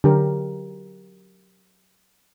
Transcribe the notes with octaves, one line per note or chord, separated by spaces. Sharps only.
D3 F#3 G4 A#4